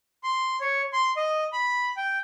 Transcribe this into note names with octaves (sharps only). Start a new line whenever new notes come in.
C6
C#5
C6
D#5
B5
G5